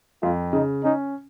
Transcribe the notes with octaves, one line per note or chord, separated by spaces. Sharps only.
F2 F4
C#3 D#4
C#4 D#4